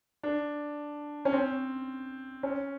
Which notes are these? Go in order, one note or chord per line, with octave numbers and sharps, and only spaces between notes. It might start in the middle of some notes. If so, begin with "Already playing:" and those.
D4
C#4
C4
C#4